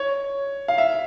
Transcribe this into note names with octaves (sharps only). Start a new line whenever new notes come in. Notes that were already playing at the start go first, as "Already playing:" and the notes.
Already playing: C#5
F5
E5